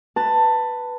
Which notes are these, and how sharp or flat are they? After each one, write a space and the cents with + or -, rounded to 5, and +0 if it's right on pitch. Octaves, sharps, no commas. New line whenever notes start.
B4 +0 A5 +15